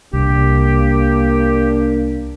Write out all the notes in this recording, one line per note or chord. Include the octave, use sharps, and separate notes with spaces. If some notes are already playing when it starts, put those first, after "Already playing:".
C2 A#3 D4 G4